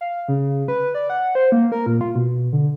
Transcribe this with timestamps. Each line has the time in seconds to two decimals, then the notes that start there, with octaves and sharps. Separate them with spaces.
0.01 F5
0.28 C#3
0.68 B4
0.95 D5
1.10 F#5
1.35 C5
1.52 A#3
1.72 A#4
1.86 A#2
2.01 F4
2.16 B2
2.53 D3